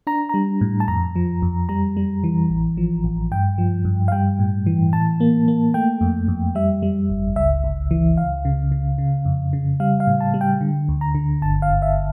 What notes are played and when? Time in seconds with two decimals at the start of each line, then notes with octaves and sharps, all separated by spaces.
0.07 D4 A#5
0.29 G3 A#5
0.61 A2
0.80 A5
0.88 F2 A#5
1.16 F3
1.42 F2
1.69 G3 A#5
1.97 G3
2.24 E3
2.50 A1
2.77 F3
3.04 A1
3.32 G2 G5
3.58 F3
3.85 G2
4.08 F5
4.12 G3 G5
4.39 A2
4.67 E3
4.93 A2 A5
5.20 A#3
5.48 A#3
5.74 A3 G5
6.01 F2
6.28 F2
6.55 G3 E5
6.82 G3
7.10 G1
7.36 C#2 E5
7.64 C#2
7.91 E3
8.17 C#2 F5
8.45 C#3
8.72 C#3
8.98 C#3
9.25 F2
9.53 C#3
9.80 G3 F5
10.00 F5
10.07 A2
10.21 A5
10.34 G3
10.41 G5
10.61 D3
10.89 D2
11.01 A#5
11.15 D3
11.42 G1 A5
11.62 F5
11.69 G1
11.82 E5